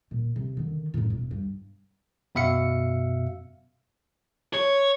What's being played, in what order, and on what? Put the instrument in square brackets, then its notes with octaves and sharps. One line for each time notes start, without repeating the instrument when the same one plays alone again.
[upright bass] A#2
C3
D3 D#3
F#2 A2
E1
G2
[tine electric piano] F#2 B2 E5 F5 C#7
[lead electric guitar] C#5